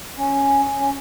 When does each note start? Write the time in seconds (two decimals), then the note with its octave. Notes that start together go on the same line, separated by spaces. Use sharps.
0.18 C#4
0.79 C#4